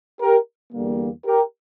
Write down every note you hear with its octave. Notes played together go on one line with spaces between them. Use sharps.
G4 A#4
E2 D3 G3 A#3
G4 A#4